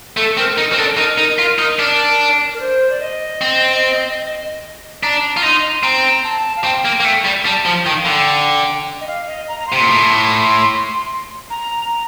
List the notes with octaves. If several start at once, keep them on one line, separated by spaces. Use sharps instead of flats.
A3 A4
C4 A#4
D#4
C4 A#4
D4 A4
D#4 A#4
D#4
F4
D#4
D4
A#4
C5
D5
D#5
C4
D4 A#5
F4
D#4 C6
C4 A#5
A5
F5
C4 G5
A#3
A#3
A3
G3
G3 A5
F3
D#3 G5
F5
D3 G5
D#5
F5
D#5
A#5
A#5
C6
C3
A#2
A2
A#5